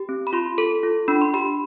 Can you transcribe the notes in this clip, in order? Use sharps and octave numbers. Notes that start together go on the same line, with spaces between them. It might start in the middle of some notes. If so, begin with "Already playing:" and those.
Already playing: G4
C4
B5
F4 C6
A4
F4
D4 B5
C6
G4 B5